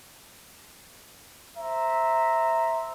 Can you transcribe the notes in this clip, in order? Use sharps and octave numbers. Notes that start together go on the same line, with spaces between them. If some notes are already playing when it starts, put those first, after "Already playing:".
C5 E5 A#5